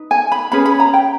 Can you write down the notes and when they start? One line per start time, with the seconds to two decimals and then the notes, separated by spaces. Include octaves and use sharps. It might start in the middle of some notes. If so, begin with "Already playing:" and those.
Already playing: D#4 B4
0.11 G#5
0.32 B5
0.52 C#4 G#4 B4 B5
0.66 B5
0.80 A#5
0.94 G5